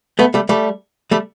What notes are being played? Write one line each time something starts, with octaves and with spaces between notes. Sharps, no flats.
A3 B3
G3 A3
G3 A3
G3 A3